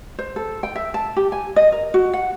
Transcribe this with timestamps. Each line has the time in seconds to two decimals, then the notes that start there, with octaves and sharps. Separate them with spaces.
0.19 C5
0.36 A4
0.63 G5
0.76 E5
0.94 A5
1.17 G4
1.32 G#5
1.56 D#5
1.72 A#4
1.94 F#4
2.13 F#5